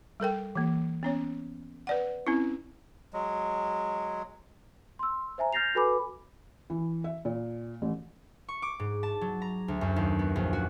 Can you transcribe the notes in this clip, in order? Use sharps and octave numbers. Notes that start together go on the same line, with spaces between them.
G3 A4 A#4 G5
E3 A#3
B3 C#4 C#5
B4 D5 F#5
C4 C#4 E4
F#3 G#3
C6 E6
C5 E5 G#5 A#5
F6 G6 A6 A#6 C7 F7
F#4 A4 B4 G#5 B5 D6
E3
E5
A#2
A1
C#6
D6
G#2
A5
F#3
A#5
D2
F#2
D#2
B3
A#1
F#4